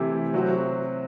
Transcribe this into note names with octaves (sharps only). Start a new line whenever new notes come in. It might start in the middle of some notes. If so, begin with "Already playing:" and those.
Already playing: C3 E3 A3 E4 G4
C3 F#3 C4 F#4